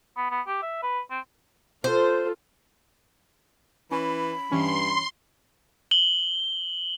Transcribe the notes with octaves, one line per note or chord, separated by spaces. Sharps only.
B3
B3
G4
E5
B4
C4
F4 A4 C5
E3 C#4 B5
G2 E3 C#4 C6
F#7 G7